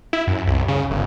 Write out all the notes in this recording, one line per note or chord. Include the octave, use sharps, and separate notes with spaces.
E4
F#2
C2
C#3
G1